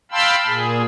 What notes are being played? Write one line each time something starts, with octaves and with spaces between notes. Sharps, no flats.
F5 G5 A5 B5 C6 E6
A#2 G#4